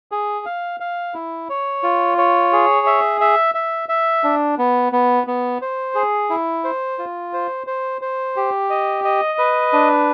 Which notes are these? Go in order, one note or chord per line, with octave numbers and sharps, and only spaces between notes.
G#4
F5
F5
E4
C#5
F4
C#5
G#4
E5
E5
E5
E5
D4
B3
B3
B3
C5
G#4
E4
C5
F4
C5
C5
C5
G4
D#5
D#5
B4
D4